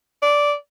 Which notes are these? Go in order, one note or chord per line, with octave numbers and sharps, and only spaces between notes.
D5